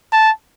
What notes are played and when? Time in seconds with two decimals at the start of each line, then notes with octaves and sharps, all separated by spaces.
0.13 A5